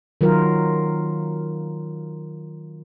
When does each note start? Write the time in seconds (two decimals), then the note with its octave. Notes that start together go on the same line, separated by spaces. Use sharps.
0.21 D#3 F#3 F4 A#4